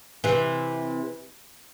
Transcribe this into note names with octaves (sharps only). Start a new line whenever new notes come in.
C3 E3